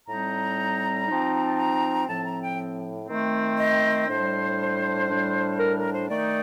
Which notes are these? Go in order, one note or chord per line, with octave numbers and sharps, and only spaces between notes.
A2 G3 C4 D#4 A#5
F3 C4 D#4
A5
A#5
A2 F3 C4 A5
A#5
G5
D#3 A3 C4
D#5
A2 G3 D4 C5
A2 G3 D4
A#4
A#4
C5
D#3 A3 D#4 D5